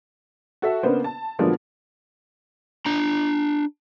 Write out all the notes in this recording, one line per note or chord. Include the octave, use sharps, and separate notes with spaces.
F#4 A4 E5
C#3 A#3 B3 D4 B4 C5
A5
A#2 D3 F3 F#3 G#3 B3
D4 A#5